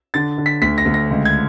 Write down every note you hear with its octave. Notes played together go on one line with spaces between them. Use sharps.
D3 A6
D3
B6
D2 B6
A#6
D2
A#6
C#2
G#6